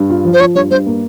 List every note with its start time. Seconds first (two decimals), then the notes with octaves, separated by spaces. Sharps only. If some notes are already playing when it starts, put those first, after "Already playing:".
Already playing: G2
0.10 F4
0.25 F3
0.33 C5
0.40 F4 C#5
0.55 G2 C#5
0.71 G2 C5
0.86 A#3